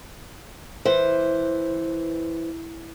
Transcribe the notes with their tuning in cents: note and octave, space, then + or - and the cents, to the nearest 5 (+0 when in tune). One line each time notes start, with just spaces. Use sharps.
E3 +0 C5 +0